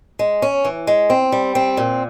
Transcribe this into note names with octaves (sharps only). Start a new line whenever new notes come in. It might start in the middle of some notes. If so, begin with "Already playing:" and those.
G#3
C#4
E3
G#3
C4
G3
C4
A#2